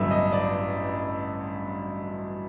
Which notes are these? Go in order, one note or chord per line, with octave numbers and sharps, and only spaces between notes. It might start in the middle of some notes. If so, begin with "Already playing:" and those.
Already playing: A1 G2 D3 F#3 B3 E5
D#5
D5